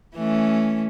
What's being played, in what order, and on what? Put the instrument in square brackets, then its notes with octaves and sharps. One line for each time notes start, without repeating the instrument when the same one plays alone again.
[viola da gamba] E3 A3 C#4